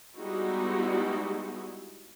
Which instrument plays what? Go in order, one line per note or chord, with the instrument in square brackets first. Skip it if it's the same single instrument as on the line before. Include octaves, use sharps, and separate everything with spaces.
[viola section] G3 G#3 B3 D#4 E4 F#4